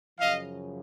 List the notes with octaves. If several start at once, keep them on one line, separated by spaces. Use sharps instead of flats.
F#2 C#3 F3 D#5 F5